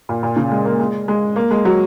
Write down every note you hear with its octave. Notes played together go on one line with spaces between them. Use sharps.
A#2
A#2
C#3
G#3
A#3
G#3
G#3
A#3
G#3
F#3